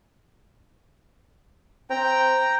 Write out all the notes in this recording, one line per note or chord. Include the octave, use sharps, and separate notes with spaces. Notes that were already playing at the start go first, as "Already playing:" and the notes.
C4 G5 A#5